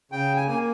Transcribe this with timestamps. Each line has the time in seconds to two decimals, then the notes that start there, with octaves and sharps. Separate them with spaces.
0.12 C#3 G5
0.36 G#5
0.47 A#3 G#5